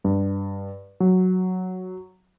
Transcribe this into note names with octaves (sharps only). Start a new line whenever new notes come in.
G2
F#3